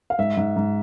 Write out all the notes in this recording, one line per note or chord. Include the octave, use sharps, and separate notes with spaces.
F5
G#2 E5
G#2
G#2